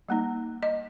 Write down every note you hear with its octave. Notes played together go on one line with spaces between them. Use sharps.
G3 A#3 D#4
D#5